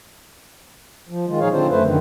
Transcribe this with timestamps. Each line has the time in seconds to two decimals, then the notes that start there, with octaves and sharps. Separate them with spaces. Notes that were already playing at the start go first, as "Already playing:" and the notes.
1.09 F3
1.27 D#3 G#3 F4
1.40 A#2 F3 D#4 G#4 C#5 F5
1.52 D3 C4 D4 F4 C5
1.69 F#2 A3 B4 C5
1.83 F#2 D3 D#3